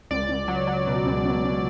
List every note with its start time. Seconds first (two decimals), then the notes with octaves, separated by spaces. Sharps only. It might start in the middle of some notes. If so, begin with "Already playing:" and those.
0.11 C#2 D5
0.29 C#2
0.48 F#3
0.67 F#3
0.87 B2
1.06 C#2
1.25 C#2
1.44 C#2